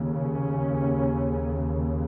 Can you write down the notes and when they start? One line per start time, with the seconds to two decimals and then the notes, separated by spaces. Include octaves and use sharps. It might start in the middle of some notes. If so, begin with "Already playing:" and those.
Already playing: D#2 C#3
0.13 C#4